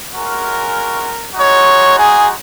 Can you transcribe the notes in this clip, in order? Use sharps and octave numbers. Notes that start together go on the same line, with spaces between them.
G#3 C#4 F#4 A#4
G#3 D#4 F#4 C#5
G#4